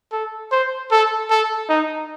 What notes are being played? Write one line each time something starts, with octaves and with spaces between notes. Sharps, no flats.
A4
C5
A4
A4
D#4